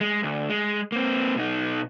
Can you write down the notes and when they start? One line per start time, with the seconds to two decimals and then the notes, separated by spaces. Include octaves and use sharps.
0.01 G#3
0.23 D2
0.50 G#3
0.92 A#3 C4
1.36 B2 D#4